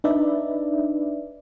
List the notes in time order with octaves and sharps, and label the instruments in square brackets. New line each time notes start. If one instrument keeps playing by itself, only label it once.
[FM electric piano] D4 D#4 B4 D5 E5